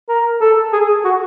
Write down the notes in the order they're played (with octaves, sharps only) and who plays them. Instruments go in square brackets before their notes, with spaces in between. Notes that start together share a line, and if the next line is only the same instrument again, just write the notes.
[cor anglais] A#4
A4
G#4
F#4